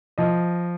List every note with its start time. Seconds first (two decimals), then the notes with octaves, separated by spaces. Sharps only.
0.18 F3 D#5